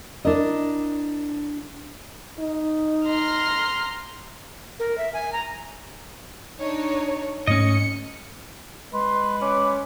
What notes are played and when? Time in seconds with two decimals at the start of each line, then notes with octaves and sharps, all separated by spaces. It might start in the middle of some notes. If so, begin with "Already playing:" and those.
0.25 D4 E4 A#4 D#5
2.39 D#4
3.06 A#5 C6 F6
4.80 A#4
4.98 E5
5.14 G#5
5.33 A#5
6.60 D4 D#4 C#5
7.47 G#2 A3 C#4 D#5 C#7
8.94 G#3 B4 C6
9.42 C#4 D6